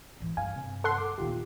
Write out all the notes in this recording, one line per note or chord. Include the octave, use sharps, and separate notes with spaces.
G#2 E3
G2 F5 G#5
C3
A4 F#5 C6
C#3 D6
D#1 D#3 B3 F4 G4